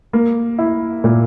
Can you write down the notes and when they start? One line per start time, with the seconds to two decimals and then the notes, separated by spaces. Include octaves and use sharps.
0.13 A#3
0.58 E4
1.04 A#2